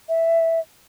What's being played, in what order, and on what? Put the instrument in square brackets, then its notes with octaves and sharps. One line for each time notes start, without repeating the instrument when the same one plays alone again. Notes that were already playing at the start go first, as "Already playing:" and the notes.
[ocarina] E5